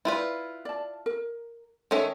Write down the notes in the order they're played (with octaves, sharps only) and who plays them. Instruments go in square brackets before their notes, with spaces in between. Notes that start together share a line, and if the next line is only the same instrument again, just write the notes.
[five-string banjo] E4 F4 B4 [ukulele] D5
[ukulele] D5 A5
A#4
[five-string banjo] D#3 C#4 E5 [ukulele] A4 A#4 D#5